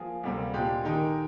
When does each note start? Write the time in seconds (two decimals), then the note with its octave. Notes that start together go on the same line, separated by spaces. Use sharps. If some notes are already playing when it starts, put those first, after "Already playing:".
Already playing: F3 A#3 G#4
0.23 D2 C3 G3 A#3
0.53 A#2 G#3 D4 G4
0.84 D#3 G#3 D#4 G4 A#4